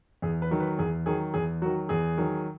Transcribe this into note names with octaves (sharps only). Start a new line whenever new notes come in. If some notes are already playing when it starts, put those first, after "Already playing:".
E2 G#4
B4
D#3 F#3
B4
E2 G#4
D#3 F#3 G#4
E2 G#4
D#3 F#3 F#4
E2 G#4
D#3 F#3